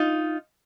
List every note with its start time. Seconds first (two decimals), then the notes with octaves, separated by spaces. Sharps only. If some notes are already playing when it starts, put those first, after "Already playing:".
Already playing: D#4 F4